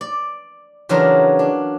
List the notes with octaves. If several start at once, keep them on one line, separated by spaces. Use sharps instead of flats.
D5
C#3 E3 F#3 D4 F4 A#4
D4